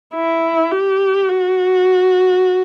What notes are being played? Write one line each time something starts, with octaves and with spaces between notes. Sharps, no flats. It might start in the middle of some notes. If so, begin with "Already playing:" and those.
E4
G4
F#4